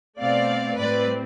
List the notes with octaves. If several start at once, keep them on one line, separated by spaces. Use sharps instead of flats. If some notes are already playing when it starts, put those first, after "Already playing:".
B2 A3 C4 D5 F5
A2 G3 C4 B4 D5